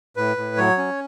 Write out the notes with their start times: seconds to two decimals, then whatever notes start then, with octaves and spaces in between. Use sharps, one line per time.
0.16 A2 B4
0.37 A2
0.57 F#3 C#5
0.78 C#4